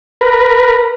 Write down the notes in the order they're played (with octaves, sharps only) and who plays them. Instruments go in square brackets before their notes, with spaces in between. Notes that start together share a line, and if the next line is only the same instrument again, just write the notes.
[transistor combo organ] A#4 B4